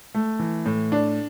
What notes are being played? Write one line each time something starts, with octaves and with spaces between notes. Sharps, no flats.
A3
E3
A2
D4